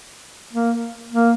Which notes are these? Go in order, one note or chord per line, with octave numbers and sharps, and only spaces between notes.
A#3
A#3